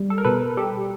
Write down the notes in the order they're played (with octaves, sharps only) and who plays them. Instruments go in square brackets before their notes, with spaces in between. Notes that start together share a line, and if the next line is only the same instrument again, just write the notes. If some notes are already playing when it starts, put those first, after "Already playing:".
Already playing: [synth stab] G3
A4
A#4
B2 A4 B4
G3 G4 A4